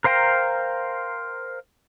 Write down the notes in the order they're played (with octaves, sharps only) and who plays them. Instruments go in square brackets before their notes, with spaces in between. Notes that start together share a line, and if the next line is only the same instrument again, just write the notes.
[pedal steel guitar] A#4 C5 F5 G5 A#5